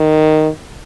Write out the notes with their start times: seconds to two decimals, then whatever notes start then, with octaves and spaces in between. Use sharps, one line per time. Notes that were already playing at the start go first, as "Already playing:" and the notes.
Already playing: D#3